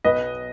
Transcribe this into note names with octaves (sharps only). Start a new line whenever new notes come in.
B1 B4 D#5